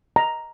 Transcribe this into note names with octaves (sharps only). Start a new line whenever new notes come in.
A#5